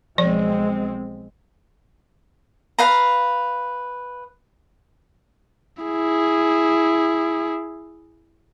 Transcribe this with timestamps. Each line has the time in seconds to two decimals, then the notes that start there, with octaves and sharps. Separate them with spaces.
0.18 B1 F3 G#3 C4 D5
2.79 B4 F5 A#5
5.83 E4 G#4